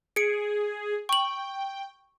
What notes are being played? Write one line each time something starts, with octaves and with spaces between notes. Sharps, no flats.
G#4 C#7 D7
G5 C#6 F#7